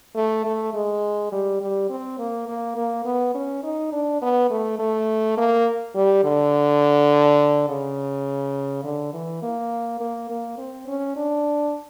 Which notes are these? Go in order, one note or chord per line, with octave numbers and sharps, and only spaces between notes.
A3
A3
G#3
G3
G3
C4
A#3
A#3
A#3
B3
C#4
D#4
D4
B3
A3
A3
A#3
G3
D3
C#3
D3
E3
A#3
A#3
A#3
C4
C#4
D4